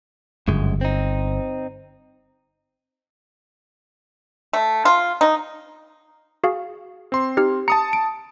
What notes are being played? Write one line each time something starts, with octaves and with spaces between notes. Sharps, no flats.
G1 C#2 F#2 G#3
C4 D#4
A3
F4
D#4
F#4 G#4 F5
C4 C6
D#4 G4 F6
A5 A#5 D#6 C#7
D7